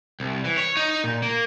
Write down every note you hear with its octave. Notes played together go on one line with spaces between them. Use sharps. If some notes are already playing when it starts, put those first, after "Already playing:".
C2
E3
C#5
D#4
A#2
A#3